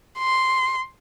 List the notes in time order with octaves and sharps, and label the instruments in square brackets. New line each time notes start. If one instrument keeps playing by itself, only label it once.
[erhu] C6